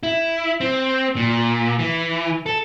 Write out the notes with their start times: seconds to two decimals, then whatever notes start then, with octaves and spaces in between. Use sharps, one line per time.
0.03 E4
0.61 C4
1.16 A#2
1.79 E3
2.46 A4